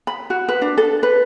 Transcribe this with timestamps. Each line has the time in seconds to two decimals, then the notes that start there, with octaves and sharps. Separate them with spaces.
0.07 B5
0.30 F#4
0.48 B4
0.62 D4
0.78 A4
1.03 B4